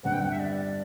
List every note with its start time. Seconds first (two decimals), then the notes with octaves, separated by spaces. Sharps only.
0.03 G1 G2 D3 G3 C4 F#5
0.13 G5
0.22 F#5
0.31 E5
0.39 D5